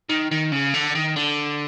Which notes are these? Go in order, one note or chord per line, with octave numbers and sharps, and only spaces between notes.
D#3
D#3
C#3
D3
D#3
D3